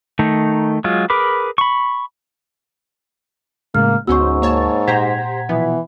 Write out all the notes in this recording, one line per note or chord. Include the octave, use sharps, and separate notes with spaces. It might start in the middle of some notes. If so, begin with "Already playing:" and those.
D#3 A3 D#4
F#3 G#3 F4
G#4 A#4 B4 B5 D6
B5 C#6
A2 C#3 G#3 A#3 F6
D2 G#2 B3 C#4 F#4 C5 C#6 E6
A#3 C#5 A5
A#2 G4 C5 F#5 A#5 G#6 B6
B2 E3 F3 B3